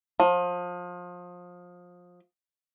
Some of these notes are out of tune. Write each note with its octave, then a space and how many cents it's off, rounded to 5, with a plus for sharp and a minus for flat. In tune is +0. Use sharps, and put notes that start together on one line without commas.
F3 +25